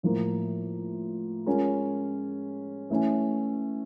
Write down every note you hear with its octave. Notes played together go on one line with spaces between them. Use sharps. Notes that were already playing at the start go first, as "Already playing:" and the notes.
A2 F3 A#3
G#3 C#4 F4 A#4
E3 A3 C#4